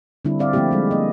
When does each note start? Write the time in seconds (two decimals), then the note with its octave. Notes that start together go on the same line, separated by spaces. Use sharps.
0.25 D3 G3 C4 D4 E4
0.39 C4 E4 D5 E5 F5
0.53 F3 A3 A#3 C4 E4 G4
0.71 G3 G#3
0.91 A#3 D#5